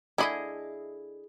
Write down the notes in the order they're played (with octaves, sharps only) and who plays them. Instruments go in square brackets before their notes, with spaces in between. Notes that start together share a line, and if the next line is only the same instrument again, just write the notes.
[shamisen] D3 A3 B5 [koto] E4 G#4 D#5